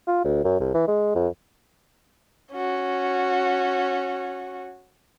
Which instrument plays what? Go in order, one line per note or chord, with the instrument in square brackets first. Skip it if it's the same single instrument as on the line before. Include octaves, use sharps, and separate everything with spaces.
[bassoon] F4
D2
F#2
C2
E3
G#3
F2
[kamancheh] C#4 F#4